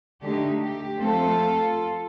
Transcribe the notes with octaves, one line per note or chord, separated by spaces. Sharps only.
D3 A3 D#4 G4
G4
F3 A3 C4 F4 A4